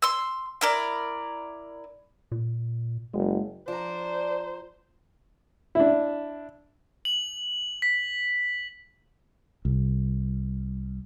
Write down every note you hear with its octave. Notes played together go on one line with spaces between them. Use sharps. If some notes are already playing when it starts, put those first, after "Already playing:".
C6 E6
E4 A#4 D5
A#2
F#1 G#3
F3 D4 C5 A#5
D4 E4
F#7
B6
C2